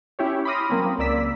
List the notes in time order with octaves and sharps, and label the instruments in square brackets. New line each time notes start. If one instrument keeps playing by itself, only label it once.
[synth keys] C#4 E4 G4 C#5
B5 C6 D6 D#6 F6 A#6
F#3 A#3 C4 C#4
C#2 A#3 D5 E6 B6